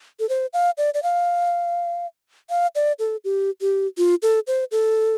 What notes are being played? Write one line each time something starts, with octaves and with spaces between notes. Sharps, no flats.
A4
C5
F5
D5
D5
F5
F5
D5
A4
G4
G4
F4
A4
C5
A4